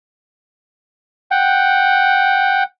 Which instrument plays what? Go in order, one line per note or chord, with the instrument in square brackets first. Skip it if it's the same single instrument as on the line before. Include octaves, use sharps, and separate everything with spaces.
[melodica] F#5 G5